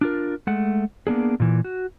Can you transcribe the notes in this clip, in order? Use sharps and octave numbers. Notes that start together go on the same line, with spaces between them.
D4 F4 A#4
G#3 A3 F#5
A#3 B3 D4 G#4
A#2 E3
F#4